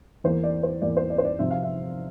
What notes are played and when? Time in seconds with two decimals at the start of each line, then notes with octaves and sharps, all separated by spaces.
0.24 E2 E3 A#3 C5
0.43 D5
0.63 C5
0.82 E2 E3 A#3 D5
0.97 C5
1.10 D5
1.18 C5
1.25 D5
1.39 C3 F3 C4 E5
1.50 F5
1.63 E5